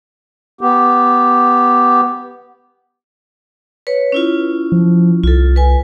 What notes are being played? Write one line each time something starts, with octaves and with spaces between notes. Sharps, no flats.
B3 G4
B4 C#5
C#4 E4 F4
F3
C2 F4 A4
B4 G#5